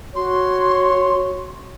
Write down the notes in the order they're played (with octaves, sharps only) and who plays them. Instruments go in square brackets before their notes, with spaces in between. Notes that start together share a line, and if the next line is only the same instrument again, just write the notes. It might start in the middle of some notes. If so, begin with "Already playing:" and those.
[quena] F#4 [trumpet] C#5 [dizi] C6